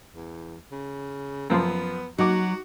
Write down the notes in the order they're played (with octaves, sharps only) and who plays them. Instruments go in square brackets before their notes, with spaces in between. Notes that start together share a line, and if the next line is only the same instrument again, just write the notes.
[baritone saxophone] E2
C#3
[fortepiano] F#2 F3 C6 [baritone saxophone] B3
[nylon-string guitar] F#3 [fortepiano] D#4 D6 [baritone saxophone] F#4